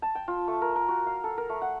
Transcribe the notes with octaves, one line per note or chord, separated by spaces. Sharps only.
A5
G5
F4
A3
A#4
A#4
F#4
F5
A4
A#4
A3
F#5